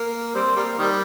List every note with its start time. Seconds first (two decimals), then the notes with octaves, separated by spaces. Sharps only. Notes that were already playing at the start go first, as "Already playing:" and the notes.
Already playing: A#3
0.35 G3 C4
0.56 G3 A#3
0.79 D#3 G3